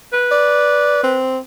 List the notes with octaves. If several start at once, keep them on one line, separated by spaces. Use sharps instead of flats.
B4
D5
C4